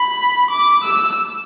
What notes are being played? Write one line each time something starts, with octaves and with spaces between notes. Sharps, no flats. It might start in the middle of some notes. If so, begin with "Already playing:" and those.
Already playing: B5
D6
E6